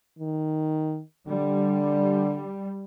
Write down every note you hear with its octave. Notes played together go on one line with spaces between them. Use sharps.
D#3
D3 G3